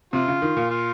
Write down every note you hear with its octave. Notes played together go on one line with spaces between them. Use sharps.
C3 F4
C#3
D#3
A#2
F4